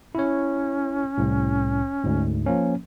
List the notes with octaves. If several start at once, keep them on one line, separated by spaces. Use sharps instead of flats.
C#4 E4 C#5
C2 A2
D2 G#2
F3 A#3 C#4